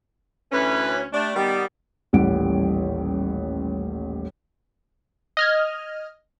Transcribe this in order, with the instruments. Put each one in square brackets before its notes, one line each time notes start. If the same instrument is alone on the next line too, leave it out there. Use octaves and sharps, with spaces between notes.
[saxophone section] D2 C#4 [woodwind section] E3 B4
[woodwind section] G3 A3 [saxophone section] D4
[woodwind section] D#3 B3 [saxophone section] G3
[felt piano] D#1 A1 E3 G3 F#5 D7
[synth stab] D#5 F6 G#6